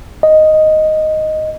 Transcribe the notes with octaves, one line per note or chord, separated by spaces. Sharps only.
D#5